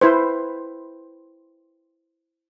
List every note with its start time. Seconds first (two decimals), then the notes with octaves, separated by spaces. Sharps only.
0.01 E4 B4 C5